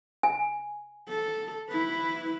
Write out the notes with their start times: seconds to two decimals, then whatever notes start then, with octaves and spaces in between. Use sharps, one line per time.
0.23 G#5
1.09 A4
1.70 E4 B4